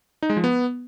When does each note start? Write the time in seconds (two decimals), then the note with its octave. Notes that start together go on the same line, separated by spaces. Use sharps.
0.23 D#4
0.30 G#3
0.37 F3
0.44 B3